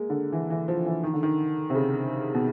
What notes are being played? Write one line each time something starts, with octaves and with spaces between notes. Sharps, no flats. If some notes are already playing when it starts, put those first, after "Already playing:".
Already playing: G#3 A#3
D3
E3
E3
F3
E3
D#3
D3
D#3
C3
C#3
B2